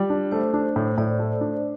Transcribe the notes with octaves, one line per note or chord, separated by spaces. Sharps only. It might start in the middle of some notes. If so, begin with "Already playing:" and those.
Already playing: G3 F4
D4
A3 C5
D4
A2
A2 D5
A3
D4